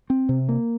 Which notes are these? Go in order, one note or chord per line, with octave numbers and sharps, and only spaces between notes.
C4
C3
A#3